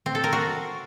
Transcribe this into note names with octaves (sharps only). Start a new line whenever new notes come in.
C4
A4
A#4
F#4